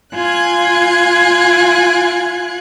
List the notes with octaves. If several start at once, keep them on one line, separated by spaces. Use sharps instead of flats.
F4 G#5 F#6 G#6